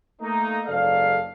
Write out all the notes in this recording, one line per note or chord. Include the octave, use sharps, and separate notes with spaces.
A3 A#3 D#4
F#1 G#2 A4 D5 F5